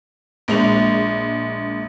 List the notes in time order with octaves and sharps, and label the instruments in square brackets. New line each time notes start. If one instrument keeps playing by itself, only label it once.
[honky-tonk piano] A#1 G#3 F7